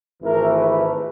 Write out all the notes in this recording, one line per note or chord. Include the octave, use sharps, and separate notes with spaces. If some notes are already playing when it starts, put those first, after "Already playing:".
G#1 G#2 E3 A3 A#4
B4